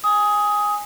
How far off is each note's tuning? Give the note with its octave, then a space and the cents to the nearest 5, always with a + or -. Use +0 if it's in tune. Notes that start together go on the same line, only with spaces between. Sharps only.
G#5 -10 D#6 +15